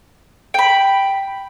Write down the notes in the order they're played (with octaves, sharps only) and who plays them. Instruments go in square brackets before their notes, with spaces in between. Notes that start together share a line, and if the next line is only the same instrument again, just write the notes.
[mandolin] G5 B5